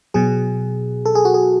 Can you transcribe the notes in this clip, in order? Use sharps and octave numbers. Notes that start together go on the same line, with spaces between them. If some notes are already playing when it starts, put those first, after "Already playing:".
B2 F#3 G#4
A4
G#4
F#4
G#4